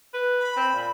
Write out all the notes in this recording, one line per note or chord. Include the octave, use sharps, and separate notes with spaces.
B4
B5
C4
A#2